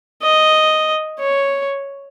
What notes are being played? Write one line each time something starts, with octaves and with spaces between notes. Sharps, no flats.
D#5
C#5